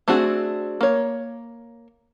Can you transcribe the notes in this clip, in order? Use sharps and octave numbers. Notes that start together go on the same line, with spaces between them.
A3 C4 D4 F#4 G#4
A#3 C#5